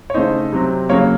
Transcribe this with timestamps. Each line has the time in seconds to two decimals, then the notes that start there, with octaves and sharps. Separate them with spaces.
0.10 C#5
0.14 C#3 A3 D#4 C5
0.53 C3 F#3 C4
0.89 C#3 F#3 A#3 C#5